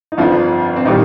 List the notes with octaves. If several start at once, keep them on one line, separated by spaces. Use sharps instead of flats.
D#4
G1 F2 F3 F4
C4
A#2 D#3 G3 D#4